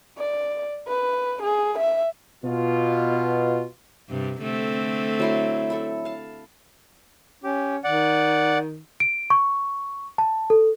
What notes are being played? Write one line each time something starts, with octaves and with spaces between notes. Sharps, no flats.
D5
B4
G#4
E5
B2 B3 F4
G2 C3
D3 A3 C4
F#3 E4 C6
A4 E5 B5
F5 A5
C#4 G4
D#3 D5 F#5
D7
C#6
A5
A4